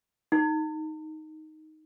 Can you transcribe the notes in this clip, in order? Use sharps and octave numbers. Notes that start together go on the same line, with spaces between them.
D#4